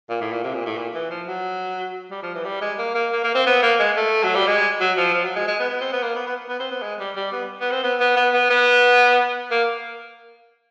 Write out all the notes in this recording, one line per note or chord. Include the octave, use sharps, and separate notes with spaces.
A#2
A2
A#2
C3
A#2
A2
A#2
E3
F3
F#3
G3
F3
E3
G3
G#3
A#3
A#3
A#3
A#3
C4
B3
A#3
G#3
A3
F#3
G3
G#3
F#3
F3
F3
F#3
G#3
G#3
B3
B3
C4
B3
A#3
B3
B3
B3
C4
B3
G#3
G3
G3
B3
B3
C4
B3
B3
B3
B3
B3
A#3